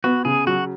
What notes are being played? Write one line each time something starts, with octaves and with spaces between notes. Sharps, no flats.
B3 F#4
C#3 G#4
F#3 F#4